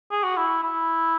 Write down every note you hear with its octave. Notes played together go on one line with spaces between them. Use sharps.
G#4
F#4
E4
E4